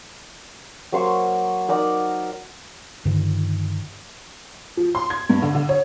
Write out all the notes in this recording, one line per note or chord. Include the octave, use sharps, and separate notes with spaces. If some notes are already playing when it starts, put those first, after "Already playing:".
F#3 A#3 C5 C#6
D#4 A#4 D5 F#5
G2 D3 D#3
F3
C6
G#6
G2
D3
D3
C#5